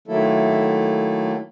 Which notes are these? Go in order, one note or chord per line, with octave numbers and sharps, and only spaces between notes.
D#3 F#3 A3 A#3 E4 A4